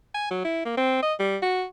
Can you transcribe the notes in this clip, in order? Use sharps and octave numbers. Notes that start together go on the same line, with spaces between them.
G#5
F#3
E4
A#3
C4
D#5
G3
F#4